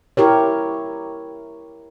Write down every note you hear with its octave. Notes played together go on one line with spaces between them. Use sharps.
E4 G4 A#4 C#5